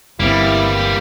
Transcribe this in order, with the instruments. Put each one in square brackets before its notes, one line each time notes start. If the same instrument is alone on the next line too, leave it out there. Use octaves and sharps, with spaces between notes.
[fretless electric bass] G1 C4 [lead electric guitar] E3 A#3 [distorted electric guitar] G3 [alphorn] E4